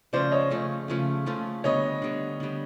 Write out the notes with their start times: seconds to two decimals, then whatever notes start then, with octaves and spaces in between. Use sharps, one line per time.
0.13 C#3 F3 A3 C#4 C5 D5
0.32 C#5 D#5
0.50 C#3 F3 A3 C#4
0.88 C#3 F3 A3 C#4
1.26 C#3 F3 A3 C#4
1.64 D3 G3 B3 C#5 D#5
2.02 D3 G3 B3
2.40 D3 G3 B3